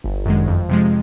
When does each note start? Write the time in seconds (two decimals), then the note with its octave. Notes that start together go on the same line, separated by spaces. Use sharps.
0.04 G1
0.26 F#2 D#3 G#3
0.48 F2
0.69 C3 F3 G#3